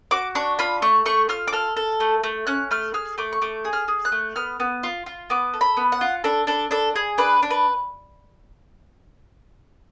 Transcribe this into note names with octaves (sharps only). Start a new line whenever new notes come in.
F#4 D6
D4 C#6
F4 B5
A3 C#6
A3 C#6
F4 F6
D6
A4 F6
A4
A3
A3
C#4 F#6
A3 F6
G#4 F6
A3 D6
C#6
A3 D6
G#4
F6
G#4
F#6
A3
B3 F6
B3
F4
F4
B3 D6
A4
B5
B3
F#5
F4
D4 A4
D4 A4
D4 A4
G#4
D4 B4
D4
B4